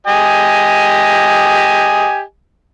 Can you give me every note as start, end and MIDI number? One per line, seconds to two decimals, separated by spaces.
0.07 2.21 67
0.07 2.21 75
0.07 2.21 80